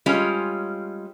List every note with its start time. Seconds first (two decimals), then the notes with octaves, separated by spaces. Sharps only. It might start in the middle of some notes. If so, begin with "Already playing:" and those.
0.06 G3 G#3 C#4 F4